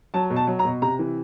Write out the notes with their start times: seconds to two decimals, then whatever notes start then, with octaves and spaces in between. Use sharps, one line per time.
0.14 F#3 A5
0.30 B2
0.36 A5
0.47 F#3
0.59 A#5
0.65 B2
0.82 C3 A#5
0.99 E3